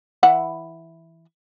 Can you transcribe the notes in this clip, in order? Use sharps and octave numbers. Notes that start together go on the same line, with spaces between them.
E3 E4 F#5